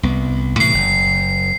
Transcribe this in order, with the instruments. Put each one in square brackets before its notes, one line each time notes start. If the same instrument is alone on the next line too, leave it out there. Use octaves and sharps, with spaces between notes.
[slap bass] C2 B3
[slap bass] A2 C3 E3 [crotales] C7
[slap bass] F#1